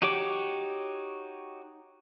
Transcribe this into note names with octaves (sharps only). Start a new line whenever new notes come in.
D#4 F#4 G4 C#5 D6